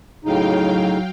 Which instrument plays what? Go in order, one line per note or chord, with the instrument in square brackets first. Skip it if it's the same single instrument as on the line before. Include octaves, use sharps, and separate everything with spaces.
[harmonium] A2 C#3 D#4 [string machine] F#3 F5 G5